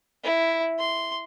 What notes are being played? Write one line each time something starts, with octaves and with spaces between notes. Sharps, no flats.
E4
C6